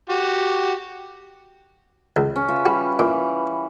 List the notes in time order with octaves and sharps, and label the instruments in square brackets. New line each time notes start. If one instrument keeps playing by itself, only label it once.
[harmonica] F#4 G4
[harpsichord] C#2
[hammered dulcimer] C#4
F4 B4 E5
[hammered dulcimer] G3 [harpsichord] F#4
[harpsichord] A#2 [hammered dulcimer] E3